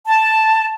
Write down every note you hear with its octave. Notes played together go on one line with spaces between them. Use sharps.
A5